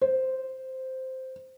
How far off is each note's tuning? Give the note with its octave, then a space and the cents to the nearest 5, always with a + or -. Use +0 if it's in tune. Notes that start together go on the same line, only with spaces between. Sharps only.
C5 -5